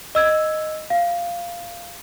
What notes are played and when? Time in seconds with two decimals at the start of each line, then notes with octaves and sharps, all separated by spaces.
0.15 D#5 E6 G#6
0.90 F5